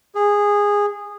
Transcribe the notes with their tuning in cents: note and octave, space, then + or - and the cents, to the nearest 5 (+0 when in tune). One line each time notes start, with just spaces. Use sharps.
G#4 -15